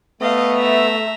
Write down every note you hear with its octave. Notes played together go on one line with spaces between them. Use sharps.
A3 B3 D#5 F5
E5 A#5